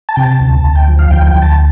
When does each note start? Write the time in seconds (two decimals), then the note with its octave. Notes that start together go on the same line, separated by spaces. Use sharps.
0.09 A5
0.16 C3 G5
0.23 A5
0.40 D2
0.64 D2 A5
0.75 G5
0.88 F3
0.99 F5
1.11 D2 G5
1.27 G5
1.34 D2
1.42 A5